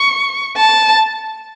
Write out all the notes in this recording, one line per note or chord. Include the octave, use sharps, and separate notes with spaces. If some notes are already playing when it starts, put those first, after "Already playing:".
Already playing: C#6
A5